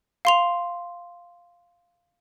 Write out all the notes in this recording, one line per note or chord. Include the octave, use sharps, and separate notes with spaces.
F5 C6 F7